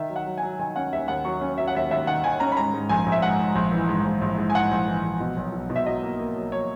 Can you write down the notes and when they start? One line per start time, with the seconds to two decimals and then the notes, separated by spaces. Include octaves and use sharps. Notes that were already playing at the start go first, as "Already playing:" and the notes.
Already playing: D#3 E5
0.09 F#3
0.16 F#5
0.26 F#3
0.38 G#5
0.43 F#3
0.59 D#3 G#5
0.76 C#4 F#5
0.92 D#2 E5
1.08 D#2 F#5
1.25 F#3 C#6
1.41 C#4
1.58 F#3 E5
1.68 F#5
1.75 D#2 E5
1.91 D#2 E5
2.07 D#3 F#5
2.24 D#3 G#5
2.40 C#4 A#5
2.52 B5
2.57 G#2 A#5
2.74 G#2
2.89 A#1 G#5
3.06 A#1
3.12 E5
3.22 G#2 F#5
3.39 G#2
3.55 A#1
3.72 E3
3.89 G#2
4.05 A#1
4.22 A#1
4.38 G#2
4.50 G#5
4.54 G#2 F#5
4.71 A#1
4.87 E3
5.04 A#1
5.20 B2
5.37 B1
5.53 B2
5.70 B2
5.76 E5
5.86 F#3 D#5
6.03 A#3
6.19 A#3
6.36 F#3
6.52 F#3 C#5